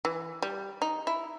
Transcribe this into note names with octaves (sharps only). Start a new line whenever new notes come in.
E3
G3
D#4
E4